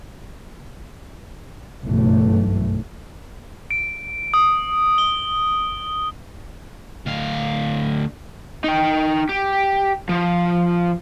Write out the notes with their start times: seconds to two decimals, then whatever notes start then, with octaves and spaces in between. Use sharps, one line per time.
1.84 F#1 B1 G2 E3 A3
3.71 D7
4.34 D#6
4.98 G7
7.06 D2 F5
8.64 D#4 G5
9.29 G4
10.09 F3